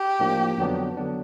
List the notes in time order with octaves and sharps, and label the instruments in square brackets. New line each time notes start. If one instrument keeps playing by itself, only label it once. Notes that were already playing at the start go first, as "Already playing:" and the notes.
Already playing: [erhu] G4
[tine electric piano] A2 F3 A#3 D4
F2 D3 F#3 B3 D4
D3 F#3 B3 D4